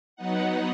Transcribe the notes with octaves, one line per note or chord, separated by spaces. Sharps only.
F#3 B3 D#4 F#5